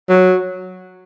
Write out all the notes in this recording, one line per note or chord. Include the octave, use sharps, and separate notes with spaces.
F#3